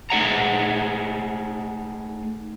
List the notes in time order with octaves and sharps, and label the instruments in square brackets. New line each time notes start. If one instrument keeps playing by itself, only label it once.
[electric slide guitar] A3 D#4 G#4 F#5 A#5